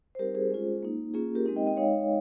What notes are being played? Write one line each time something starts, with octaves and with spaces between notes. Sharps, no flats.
C5
G3 C4 D#4 G4 A#4
G#4 C5
G#3 C#4 F4
A#3 D#4
A#3 C#4 F4 G#4
G4 A#4
G#3 C4 D#4
D#5 G5
D#5 G5
G#3 D#4 C#5 F5